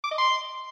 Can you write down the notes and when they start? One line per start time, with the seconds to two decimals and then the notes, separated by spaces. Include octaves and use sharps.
0.04 D6
0.11 D#5
0.18 C6